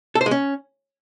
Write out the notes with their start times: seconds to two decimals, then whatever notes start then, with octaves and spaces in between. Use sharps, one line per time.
0.15 A4
0.21 C5
0.26 G#3
0.31 C#4